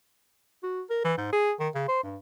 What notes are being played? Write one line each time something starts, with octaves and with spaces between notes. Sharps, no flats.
F#4
A#4
E3
G#2
G#4
D#3
C#3
C5
G2